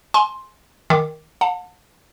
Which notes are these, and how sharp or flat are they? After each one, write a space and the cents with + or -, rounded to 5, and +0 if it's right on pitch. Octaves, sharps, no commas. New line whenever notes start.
G#5 +10 C6 +10
D#3 +0 D6 +0
F#5 -45 A5 +25